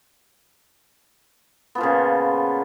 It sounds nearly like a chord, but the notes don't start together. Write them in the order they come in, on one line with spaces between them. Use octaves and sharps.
B3 F3 A#2 C#3